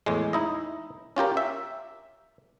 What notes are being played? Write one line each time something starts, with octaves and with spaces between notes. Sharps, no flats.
E2 A2 G#3
D#4 E4 D#5
C#4 F4 G4 A#4
E5